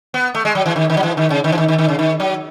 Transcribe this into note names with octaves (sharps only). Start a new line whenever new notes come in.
B3
A3
G#3
F#3
E3
D#3
D#3
F#3
E3
D#3
C#3
D#3
E3
D#3
D#3
D#3
C#3
D#3
F#3